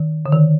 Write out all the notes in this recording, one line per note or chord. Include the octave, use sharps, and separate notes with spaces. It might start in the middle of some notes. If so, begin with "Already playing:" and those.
Already playing: D#3
D3
D#3